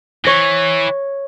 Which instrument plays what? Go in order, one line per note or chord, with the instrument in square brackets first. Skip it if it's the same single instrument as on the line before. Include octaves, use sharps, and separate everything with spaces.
[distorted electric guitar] E3 [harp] C#5 A#6